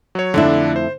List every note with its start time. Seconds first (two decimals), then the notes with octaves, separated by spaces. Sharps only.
0.15 F#3 C#5
0.34 F2 D3 A3 D4 E4
0.76 C5